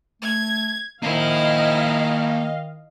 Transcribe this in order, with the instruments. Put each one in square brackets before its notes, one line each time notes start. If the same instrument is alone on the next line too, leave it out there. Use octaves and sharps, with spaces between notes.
[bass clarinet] A3 [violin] G#6
[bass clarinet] D#3 [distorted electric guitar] A#3 C5 [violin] D#4 E4 [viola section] D#5 F5